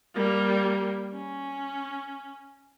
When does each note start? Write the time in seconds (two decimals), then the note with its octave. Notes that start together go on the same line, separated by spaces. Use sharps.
0.14 G3 A#3
1.14 C#4